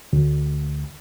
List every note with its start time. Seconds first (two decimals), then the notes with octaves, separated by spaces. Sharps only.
0.13 D2